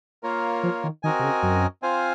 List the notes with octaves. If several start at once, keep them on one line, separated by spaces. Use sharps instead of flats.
A#3 F4 A#4 C#5
F3
D#3
D#3 C4 F#4 A#4 D#5 G#5
C3
C#3
F#2
C4 F4 C5 F5 G#5